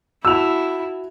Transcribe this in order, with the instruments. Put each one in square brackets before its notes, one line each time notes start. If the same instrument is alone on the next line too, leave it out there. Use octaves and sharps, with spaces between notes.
[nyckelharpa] E4 [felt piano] F#4 A5 [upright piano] E6 F7